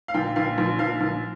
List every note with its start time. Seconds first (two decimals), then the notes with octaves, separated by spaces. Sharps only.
0.08 F5
0.14 A#1 G5
0.36 A#1 F5
0.58 A#1
0.79 A#1 F5
1.01 A#1